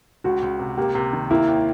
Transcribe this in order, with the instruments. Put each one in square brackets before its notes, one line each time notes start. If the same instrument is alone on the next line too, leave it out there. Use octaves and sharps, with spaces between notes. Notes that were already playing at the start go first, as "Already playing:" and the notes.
[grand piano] C#2 [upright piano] F#4
[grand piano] C#2
C3
[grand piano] A#3 [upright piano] G4
[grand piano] C3
D#3
[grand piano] A#3 [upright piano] E4
[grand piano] D#2